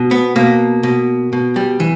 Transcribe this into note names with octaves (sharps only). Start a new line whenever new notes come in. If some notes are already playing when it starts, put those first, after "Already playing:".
Already playing: B2
B3
B2 A#3
B2
B2
G3
E3